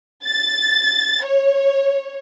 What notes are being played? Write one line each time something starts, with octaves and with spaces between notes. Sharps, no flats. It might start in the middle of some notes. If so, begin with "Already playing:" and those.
A6
C#5